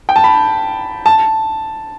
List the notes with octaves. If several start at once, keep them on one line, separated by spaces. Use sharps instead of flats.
G5
A5
B5
A5